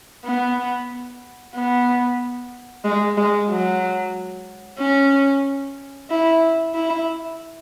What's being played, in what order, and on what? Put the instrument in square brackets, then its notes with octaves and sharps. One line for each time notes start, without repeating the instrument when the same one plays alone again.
[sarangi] B3
B3
G#3
G#3
F#3
C#4
E4
E4